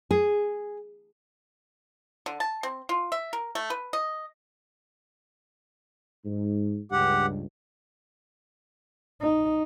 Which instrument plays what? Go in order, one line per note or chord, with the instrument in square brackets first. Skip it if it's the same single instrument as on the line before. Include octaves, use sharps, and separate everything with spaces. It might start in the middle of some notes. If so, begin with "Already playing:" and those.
[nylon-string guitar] G#4
[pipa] D3
A5
C4
F4
E5
A#4
A3
B4
D#5
[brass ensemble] G#2
[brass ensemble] C#2 G2 [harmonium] G4 F#5
[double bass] D#4